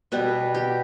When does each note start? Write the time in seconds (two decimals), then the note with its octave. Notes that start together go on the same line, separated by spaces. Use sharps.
0.12 B2 G3 B3 B4
0.55 G4